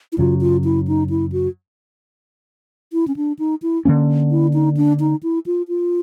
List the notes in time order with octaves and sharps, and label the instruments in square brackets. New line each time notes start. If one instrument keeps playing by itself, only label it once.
[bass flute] E4
[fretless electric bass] F#2 C#3 F#3 [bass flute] F4
[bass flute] F4
E4
D#4
E4
F#4
E4
C#4
D4
D#4
E4
[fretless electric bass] D3 F#3 A#3 C#4
[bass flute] E4
D#4
D4
D#4
E4
F4
F4